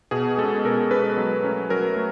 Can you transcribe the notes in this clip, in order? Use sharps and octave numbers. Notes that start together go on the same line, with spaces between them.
B2 G#4
G#3 C#4 A4
B2 A#4
G#3 C#4 B4
F#3
A3 C#4
F#3 A#4
A3